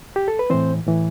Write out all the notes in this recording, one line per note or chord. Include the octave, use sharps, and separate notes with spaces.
G4
A4
B4
A2 E3 C4 C5
A2 E3